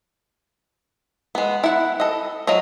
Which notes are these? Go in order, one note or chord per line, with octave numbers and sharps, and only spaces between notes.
G#3 B3
E4 F#5
A4 D#5
F#3 F4 C#5 D#5